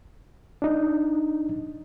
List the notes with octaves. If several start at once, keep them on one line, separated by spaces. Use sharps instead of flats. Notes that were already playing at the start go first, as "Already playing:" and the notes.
D4 D#4